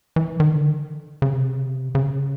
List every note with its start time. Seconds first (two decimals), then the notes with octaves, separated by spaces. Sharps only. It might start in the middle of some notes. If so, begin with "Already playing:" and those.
0.16 E3
0.40 D#3
0.55 D3
1.22 C#3
1.33 C3
1.95 C#3